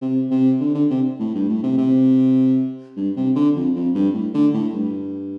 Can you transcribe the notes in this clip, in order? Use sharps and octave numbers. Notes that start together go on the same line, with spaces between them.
C3
C3
D3
D3
C3
A2
G2
A2
C3
C3
G2
C3
D3
F2
F2
G2
A2
D3
A2
G2